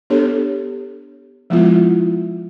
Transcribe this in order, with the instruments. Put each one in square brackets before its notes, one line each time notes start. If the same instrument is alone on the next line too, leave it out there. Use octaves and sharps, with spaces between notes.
[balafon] B3 D4 G4 A4 C#5
F3 G#3 B3 E4 F4